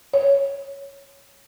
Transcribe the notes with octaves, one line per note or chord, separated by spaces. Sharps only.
C#5